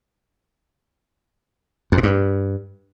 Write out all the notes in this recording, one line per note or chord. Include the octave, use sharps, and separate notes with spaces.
F2
A#2
G2